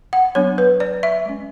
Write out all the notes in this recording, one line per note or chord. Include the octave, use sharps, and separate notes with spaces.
F#5
F#3 B3 D4 C#5
B4
D5
E5
G#3 C#4